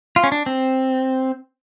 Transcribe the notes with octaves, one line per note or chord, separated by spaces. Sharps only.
F4
C#4
D4
C4